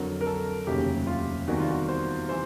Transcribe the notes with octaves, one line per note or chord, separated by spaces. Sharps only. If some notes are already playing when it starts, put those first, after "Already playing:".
Already playing: F2 D3 F#3 A#4
A#4
A4
F1 D#2 C#3 F#3 G4
F4
E2 C3 D#3 G3 F#4
F4
F#4
C5
C3 E3 C5